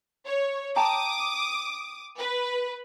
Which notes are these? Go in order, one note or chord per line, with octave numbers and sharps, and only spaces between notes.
C#5
G5 A5 A#5 D6 D#6
B4